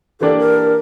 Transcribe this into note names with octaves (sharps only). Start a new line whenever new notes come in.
E3 A#3 D4 G4 A4 D5
A#4